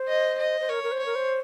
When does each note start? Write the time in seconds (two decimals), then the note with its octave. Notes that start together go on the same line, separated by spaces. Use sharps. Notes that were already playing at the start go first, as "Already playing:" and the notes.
Already playing: C5
0.08 D#5
0.39 D#5
0.61 C5
0.69 A#4 C#5
0.83 A#4
0.92 C5
0.99 C#5
1.06 A#4
1.15 C5